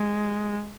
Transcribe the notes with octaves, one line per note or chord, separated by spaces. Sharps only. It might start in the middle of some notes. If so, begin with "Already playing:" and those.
Already playing: G#3